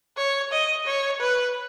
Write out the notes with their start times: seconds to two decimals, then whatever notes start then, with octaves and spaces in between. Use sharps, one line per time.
0.17 C#5
0.52 D#5
0.86 C#5
1.20 B4